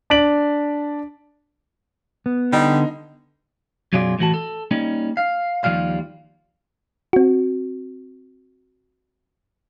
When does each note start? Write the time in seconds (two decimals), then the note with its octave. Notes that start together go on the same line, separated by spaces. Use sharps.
0.10 D4 D5 B6 D7 F#7
2.26 B3
2.53 D3 G3 D#4
3.93 F#2 B2 F#3 F4 G#4 D5
4.19 A2 E3 F#4 A5
4.34 A4
4.71 G3 A#3 C#4 D#4
5.17 F5
5.64 D#2 C#3 F3 G3 F5
7.13 C4 F#4